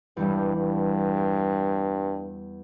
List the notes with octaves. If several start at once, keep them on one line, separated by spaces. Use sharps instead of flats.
E2 G2 E3 G3
G2